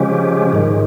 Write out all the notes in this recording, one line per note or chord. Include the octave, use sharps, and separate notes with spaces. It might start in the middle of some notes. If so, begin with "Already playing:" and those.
Already playing: C#3 F3 G#3 C#4 G4
G#2 D#3 G#3